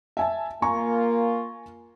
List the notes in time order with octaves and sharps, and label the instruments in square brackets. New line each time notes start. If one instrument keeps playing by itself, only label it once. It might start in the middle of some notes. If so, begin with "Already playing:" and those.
[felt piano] E5 G#5 A5
[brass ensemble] A#3 F4 [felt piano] G#5 A#5 C#6